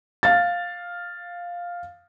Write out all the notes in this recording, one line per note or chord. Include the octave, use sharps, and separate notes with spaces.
F5 A6